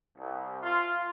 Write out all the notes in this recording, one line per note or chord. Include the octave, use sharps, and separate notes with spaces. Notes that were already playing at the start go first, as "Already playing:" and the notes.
C2
F4